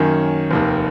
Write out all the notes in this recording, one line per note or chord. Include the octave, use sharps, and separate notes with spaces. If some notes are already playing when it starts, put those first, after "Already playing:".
Already playing: F#2 D#3 A#3 C#4
F1 D#2 D#3